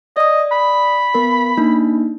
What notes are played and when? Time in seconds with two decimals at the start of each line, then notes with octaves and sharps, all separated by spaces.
0.17 D5 D#5 D#6
0.52 B5
1.14 B3 A#4
1.57 A#3 D4 D#4